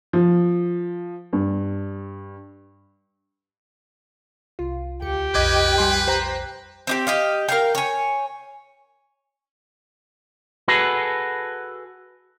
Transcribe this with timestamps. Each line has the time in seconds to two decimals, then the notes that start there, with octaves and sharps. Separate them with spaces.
0.13 F3
1.33 G2
4.59 C2 F4
5.02 D2 G4 C#7
5.35 B1 F2 B4 D#5 D6 G#6
5.78 G3 G#5 C6
6.08 C5 G5 A#5
6.87 C4 D#4 G4
7.07 G4 D#5 F5
7.48 A#4 F5 G5
7.75 C#5 G#5
10.68 F#4 G#4 A4 B4